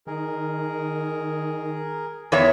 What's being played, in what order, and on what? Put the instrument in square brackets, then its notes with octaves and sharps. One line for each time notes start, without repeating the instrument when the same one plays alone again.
[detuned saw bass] D#3 [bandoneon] G#4 A#4
[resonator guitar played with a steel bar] E2 C#5 E5 [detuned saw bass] B3 [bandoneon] G5 A#5 C6